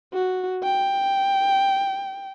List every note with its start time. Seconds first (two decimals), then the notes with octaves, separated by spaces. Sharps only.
0.13 F#4
0.63 G5